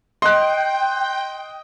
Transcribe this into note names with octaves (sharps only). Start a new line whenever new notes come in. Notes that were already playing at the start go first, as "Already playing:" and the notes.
D#5 G5 C6 F#6